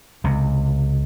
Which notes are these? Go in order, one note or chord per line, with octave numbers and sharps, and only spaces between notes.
C#2 C3